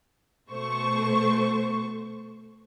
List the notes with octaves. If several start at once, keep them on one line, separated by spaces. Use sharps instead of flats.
B2 A3 C5 C#6